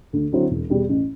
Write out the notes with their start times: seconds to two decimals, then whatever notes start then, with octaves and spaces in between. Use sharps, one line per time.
0.13 D2
0.32 D3 F#3 C4 E4
0.51 E1
0.70 E2 B2 G3
0.89 A1